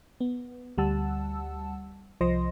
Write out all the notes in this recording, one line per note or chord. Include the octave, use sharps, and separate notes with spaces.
B3
D2 G3 F#5 A5 E6
C2 F3 C5 D#5 C6 A#6